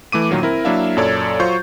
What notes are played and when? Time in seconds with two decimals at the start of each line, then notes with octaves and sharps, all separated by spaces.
0.12 E3 A3 D6 D#7
0.31 A#2 D#3 F#3 A#3
0.42 C4 E4 A#4
0.65 F#3 A#3 D4 E4 E5 F5
0.97 F#2 A#2 A4 C#5 D5 G#6
1.40 F#3 F4 C5 C#6 G6